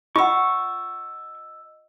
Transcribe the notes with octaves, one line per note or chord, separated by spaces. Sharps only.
F4 D#5 F#5 C#6 E6